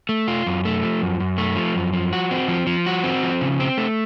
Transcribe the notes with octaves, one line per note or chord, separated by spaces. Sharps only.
A3
F4
F#2
A3
F3
F#2
F#2
A3
F3
F#2
F3
F#4
C4
F3
F3
F#4
C4
F3
C#3
C4
A3